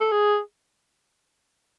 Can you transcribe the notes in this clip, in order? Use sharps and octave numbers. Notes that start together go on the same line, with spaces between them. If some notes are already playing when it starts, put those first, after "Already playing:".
A4
G#4